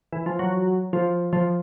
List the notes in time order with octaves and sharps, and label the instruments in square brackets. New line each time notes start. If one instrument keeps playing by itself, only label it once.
[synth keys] E3
F3
F#3
F3
F3